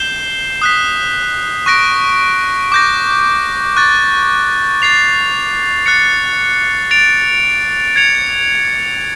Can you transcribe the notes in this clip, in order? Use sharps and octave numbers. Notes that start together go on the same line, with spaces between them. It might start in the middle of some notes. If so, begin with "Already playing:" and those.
Already playing: G6 C7 E7 G7
D#6 F#6 B6
C#6 F#6 A#6 D7
D6 G6 A#6
C#6 F#6 A6
A6 C7 F7
F#6 A6 C#7
A6 D7 F7
G#6 C#7 F7